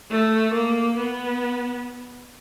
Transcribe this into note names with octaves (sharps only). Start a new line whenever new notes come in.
A3
A#3
B3